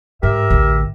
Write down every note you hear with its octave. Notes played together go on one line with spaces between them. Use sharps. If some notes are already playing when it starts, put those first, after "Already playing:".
G#2 G4 A#4 E5
A1 D2